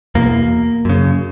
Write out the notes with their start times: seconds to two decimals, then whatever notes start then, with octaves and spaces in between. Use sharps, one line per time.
0.15 E2 B2 A#3
0.85 F#2 C#3